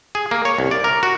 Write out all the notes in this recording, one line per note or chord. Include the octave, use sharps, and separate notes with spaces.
G#4
A#3
C#5
C2
D5
A#4
F#4